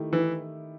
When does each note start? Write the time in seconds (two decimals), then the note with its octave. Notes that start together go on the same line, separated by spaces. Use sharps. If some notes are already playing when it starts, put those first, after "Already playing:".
Already playing: D#3 A3 E4 G4
0.13 E3